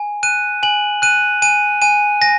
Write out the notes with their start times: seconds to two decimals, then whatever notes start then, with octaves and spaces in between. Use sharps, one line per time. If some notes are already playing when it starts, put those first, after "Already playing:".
Already playing: G#5
0.23 F#6 D#7
0.63 G#5 F#7
1.02 F#6 D#7
1.42 G#5 D#7
1.82 G#5 D#7
2.21 G#5 A#6